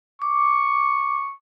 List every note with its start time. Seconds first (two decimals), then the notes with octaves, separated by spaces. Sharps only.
0.22 C#6 D6